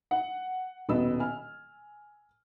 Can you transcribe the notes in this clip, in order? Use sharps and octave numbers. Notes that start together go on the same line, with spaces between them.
F#5
D#1 B2 B3 E6
G#5 F6